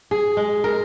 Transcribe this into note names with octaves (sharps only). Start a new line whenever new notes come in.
G#4
G#3
A#4